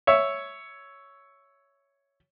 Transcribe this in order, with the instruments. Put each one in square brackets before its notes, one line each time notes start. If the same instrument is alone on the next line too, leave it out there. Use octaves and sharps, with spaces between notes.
[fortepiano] C#5 E5